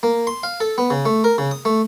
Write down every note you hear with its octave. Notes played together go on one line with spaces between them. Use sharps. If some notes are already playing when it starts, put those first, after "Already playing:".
A#3
C6
F5
A4
B3
C#3
A3
A#4
C#3
D#6
A3